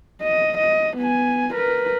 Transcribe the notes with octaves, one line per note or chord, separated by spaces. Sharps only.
D#5
D#5
B3 G#5
A#4 B4